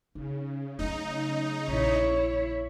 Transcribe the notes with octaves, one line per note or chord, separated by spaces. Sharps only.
C#3 D#4
F#3 A3 D#4
A#1 F2 E4 C#5